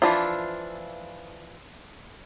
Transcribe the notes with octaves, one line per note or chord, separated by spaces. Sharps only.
E3 F3 D4 E4 F4